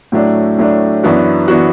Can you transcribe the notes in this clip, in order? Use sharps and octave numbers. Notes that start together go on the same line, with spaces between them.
A2 F#3 A3 D4
A2 F#3 A3 D4
F#2 E3 B3 D4 F#4
E3 B3 D4 F#4